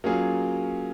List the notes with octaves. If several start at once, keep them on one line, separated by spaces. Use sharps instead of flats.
F#3 A#3 C#4 F4 G#4